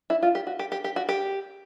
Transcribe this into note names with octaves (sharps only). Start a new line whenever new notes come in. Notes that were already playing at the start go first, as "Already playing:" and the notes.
E4
F4
G4
F#4
G4
G4
G4
F#4
G4